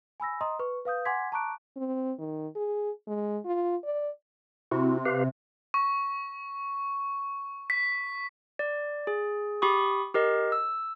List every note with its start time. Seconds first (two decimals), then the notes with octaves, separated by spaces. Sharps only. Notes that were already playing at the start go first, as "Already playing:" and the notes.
0.20 G#5 B5 E6 A#6
0.41 D#5 A#5 C6 D#6
0.59 B4 C#6
0.85 B4 F5 D#6 G6
1.05 F#5 G#5 C6 D6 G#6 B6
1.32 A5 A#5 C#6 D6 F#6 D7
1.77 C4
2.19 D#3
2.56 G#4
3.08 G#3
3.45 F4
3.84 D5
4.72 C3 E4 F#4
5.06 G4 B4 F5
5.74 C#6
7.70 B6
8.59 D5
9.07 G#4
9.62 G4 B5 C#6 D#6
10.14 G4 A#4 D#5
10.52 E6